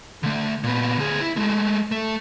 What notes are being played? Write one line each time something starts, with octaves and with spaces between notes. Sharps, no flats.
D3 A3
A#2 B3
D2 G#4
E4
G#3 A3
A3